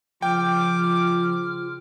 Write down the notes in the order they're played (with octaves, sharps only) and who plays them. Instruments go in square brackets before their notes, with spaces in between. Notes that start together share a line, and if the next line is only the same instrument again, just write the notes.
[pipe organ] C#3 F4 F6 [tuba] F3 [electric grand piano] G5 [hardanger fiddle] D6